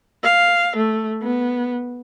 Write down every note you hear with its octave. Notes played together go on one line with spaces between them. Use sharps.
F5
A3
B3